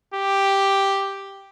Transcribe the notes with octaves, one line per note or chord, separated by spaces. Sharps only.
G4